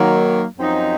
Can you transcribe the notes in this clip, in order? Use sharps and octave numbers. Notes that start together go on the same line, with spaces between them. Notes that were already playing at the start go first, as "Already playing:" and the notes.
Already playing: D#3 F#3 A#3
F#2 F3 C4 D#4